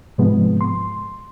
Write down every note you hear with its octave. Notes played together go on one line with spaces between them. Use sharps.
G#2 C3 F3 G#3 B3
C6